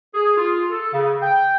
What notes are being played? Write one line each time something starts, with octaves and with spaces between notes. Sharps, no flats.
G#4
F4
A4
C#3
G5